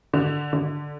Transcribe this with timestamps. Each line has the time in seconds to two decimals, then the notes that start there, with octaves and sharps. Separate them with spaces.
0.13 D3
0.53 D3